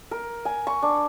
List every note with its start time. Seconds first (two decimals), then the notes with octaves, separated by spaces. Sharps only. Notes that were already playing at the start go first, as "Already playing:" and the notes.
0.11 A#4
0.45 G#5
0.67 C#6
0.82 D4